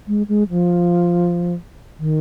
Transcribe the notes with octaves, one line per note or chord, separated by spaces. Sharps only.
G#3
G#3
F3
D#3